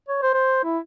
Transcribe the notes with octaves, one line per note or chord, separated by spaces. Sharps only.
C#5
C5
C5
E4